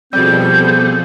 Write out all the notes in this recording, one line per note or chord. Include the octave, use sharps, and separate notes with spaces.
B2 F3 G3 C4 G#4 A4 G6